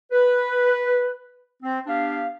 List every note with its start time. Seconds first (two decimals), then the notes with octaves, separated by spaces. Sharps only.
0.12 B4
1.63 C4
1.86 B3 D4 G4 F5